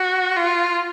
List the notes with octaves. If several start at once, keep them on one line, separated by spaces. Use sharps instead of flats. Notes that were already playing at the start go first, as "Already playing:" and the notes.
Already playing: F#4
F4